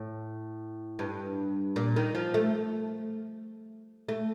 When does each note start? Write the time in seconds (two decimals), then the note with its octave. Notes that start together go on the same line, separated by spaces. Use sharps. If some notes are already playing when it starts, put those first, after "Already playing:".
Already playing: A2
0.99 G2
1.76 A#2
1.96 D#3
2.15 F3
2.34 A3
4.08 A3